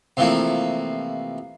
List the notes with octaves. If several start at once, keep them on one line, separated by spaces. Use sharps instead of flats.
C3 E3 F3 A3 A#3